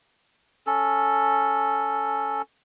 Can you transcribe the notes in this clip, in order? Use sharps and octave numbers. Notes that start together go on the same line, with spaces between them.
C#4 A4